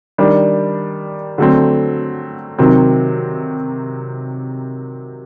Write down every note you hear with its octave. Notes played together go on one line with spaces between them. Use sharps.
D#3 G3 D4
D3 F#3 A3 C4
C3 D#3 F#3 C4